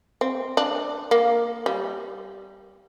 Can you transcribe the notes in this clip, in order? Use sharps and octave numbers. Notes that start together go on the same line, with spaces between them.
C4
D4
A#3
G3